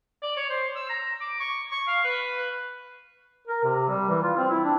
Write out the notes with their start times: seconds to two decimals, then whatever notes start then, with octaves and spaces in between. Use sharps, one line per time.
0.22 D5
0.37 C#5
0.50 C5
0.76 E6
0.89 A#5
1.21 D6
1.40 C#6
1.71 C#6
1.87 F5
2.04 B4
3.48 A#4
3.64 C3
3.89 G3
4.09 E3
4.23 F4
4.38 C4
4.50 E4
4.64 D4